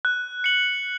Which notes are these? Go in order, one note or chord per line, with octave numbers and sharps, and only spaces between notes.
F#6
C#7 F#7